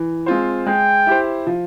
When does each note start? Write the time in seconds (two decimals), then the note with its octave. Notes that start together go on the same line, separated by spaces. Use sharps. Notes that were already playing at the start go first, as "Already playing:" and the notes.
Already playing: E3
0.26 G#3 C4 F4 C5
0.66 G#3 G5
1.06 E4 G4 C5
1.47 F3